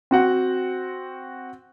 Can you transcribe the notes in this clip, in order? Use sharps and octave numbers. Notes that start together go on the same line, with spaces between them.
C4 F#4 F#5